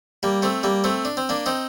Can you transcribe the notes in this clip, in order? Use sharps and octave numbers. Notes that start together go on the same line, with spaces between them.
G3 A#3
A3 C4
G3 A#3
A3 C4
D4
C4
A#3 D4
C4 D#4